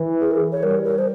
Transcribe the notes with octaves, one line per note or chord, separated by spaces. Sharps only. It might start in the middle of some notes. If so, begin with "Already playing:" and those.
Already playing: E3
G#4
A#4
C#5
G3 A#4
A#4
C5